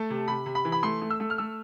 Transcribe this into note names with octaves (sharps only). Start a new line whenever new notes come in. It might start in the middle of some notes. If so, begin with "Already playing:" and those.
Already playing: A3 A5
C3
C3 B5
C3
B5
E3
B5
A3 C6
A3
E6
A3
F6
A3 E6